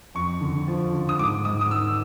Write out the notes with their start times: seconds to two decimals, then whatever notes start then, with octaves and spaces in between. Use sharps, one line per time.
0.15 F2 C#6
0.41 D3
0.68 F3
0.93 D3
1.09 D#6
1.19 G#2 D6
1.45 G#2 D#6
1.61 D#6
1.71 D#3 E6